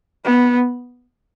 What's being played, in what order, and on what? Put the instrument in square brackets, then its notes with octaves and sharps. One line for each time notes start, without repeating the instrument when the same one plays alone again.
[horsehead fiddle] B3